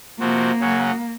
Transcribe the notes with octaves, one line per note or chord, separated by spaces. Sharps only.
C3 F3 A#3 C4 F#4
C#3 F#3 C#4 F#4